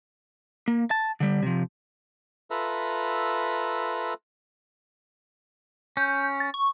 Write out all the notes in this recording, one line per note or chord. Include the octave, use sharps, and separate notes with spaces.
A#3
A5
D3 G3
C3 F3
F4 A4 B4 E5 A#5
C#4 G6
A6
C#6